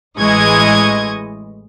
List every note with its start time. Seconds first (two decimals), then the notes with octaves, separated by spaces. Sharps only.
0.16 A1 E3 G#3 D#5 C#6 G#6